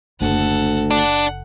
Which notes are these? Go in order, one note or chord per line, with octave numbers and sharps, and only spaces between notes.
F#1 D2 A4 F#5
D4 F#5